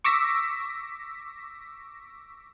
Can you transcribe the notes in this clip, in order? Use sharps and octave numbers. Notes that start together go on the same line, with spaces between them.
C#6 D6 E6 A#6 B6